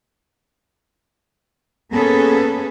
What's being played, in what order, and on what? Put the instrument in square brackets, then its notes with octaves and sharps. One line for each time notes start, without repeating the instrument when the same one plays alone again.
[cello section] A#3 B3 C#4 G#4 A4 B4